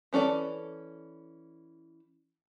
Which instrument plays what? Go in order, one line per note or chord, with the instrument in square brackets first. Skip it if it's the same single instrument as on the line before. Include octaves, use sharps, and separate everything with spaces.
[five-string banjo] E3 C#4 A4 D5